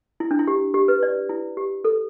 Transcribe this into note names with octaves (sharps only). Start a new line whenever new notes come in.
E4
D4
E4
G4
G4
B4
D5
E4
G4
A4